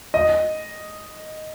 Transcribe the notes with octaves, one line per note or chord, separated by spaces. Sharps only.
D#5